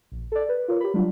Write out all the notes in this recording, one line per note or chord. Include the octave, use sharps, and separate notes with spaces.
A#1
A4 D5
B4
F4 A#4 C#5
G4 B5
F#3 G3 D4 F4